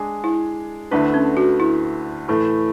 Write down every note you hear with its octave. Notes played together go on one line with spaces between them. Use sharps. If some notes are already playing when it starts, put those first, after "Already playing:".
Already playing: G#3 D4 G#4
E4
D2 D3 A3 D4 E4 B4
C#4
F#4
E4
A2 E3 A3